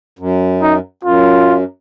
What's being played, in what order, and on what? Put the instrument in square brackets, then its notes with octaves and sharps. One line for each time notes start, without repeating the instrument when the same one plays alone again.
[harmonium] F#2
[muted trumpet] D#4
[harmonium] F#2 [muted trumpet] F4